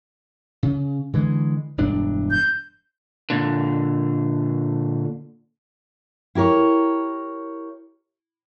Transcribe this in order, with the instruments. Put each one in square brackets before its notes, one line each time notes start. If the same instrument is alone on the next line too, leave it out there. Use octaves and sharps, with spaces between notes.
[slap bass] C#3
D3 E3 G#3
E1 G2 D4
[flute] G6
[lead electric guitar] A#2 D3
[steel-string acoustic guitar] E4 G4 A#4 C#5